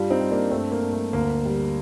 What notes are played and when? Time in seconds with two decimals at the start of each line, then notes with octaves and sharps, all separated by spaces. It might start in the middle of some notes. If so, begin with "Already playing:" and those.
Already playing: G2 G3 D4 F4
0.10 C4 D#4
0.21 G3
0.31 A#3 D4
0.51 G2 A3 C4
0.72 A#3
0.82 G2
0.93 A3
1.13 D2 A#3
1.45 G3